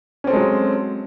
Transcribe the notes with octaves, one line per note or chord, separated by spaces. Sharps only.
F#3 G#3 C4 C#4 A4